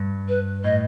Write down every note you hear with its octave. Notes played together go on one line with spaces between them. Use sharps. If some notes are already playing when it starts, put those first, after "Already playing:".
Already playing: G2
B4
A2 D#5